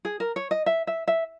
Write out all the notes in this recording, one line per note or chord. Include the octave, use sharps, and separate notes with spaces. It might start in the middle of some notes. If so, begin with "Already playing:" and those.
G#4
A#4
C#5
D#5
E5
E5
E5